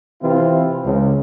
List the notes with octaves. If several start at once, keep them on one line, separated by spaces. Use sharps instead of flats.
C3 E3 C4 E4 F4
C#2